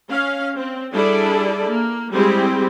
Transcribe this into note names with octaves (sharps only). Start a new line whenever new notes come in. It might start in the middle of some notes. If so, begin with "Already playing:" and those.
C#4 F5
C4
G3 D4 E4 G#4 A4 D5
A#3
G3 G#3 C4 E4 G4 G#4